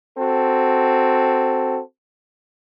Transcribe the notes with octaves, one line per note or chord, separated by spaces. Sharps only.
C4 F#4 A4